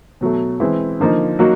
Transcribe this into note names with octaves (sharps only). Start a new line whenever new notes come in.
B2 F#3 A3
E3 G#3 C4 E4
D3 F3 A#3 D#4
F#3 A#3 D#4 F#4